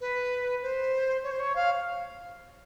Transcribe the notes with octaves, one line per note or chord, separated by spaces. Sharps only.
B4
C5
C#5
C5
C#5
F5